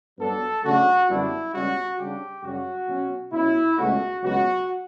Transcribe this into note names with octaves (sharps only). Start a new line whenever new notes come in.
G2 F#3 B3 D4 A4
C#3 F#3 A3 D4 F#4
F#2 D3 G3 B3 D4 E4
C#2 B2 G3 C#4 F#4
C#3 G3 D4 G4
F#2 C#3 G3 C#4 F#4
B2 F#3 C#4
B2 F#3 C#4 E4
C#2 B2 A3 C#4 F#4
C#2 B2 F#3 B3 F#4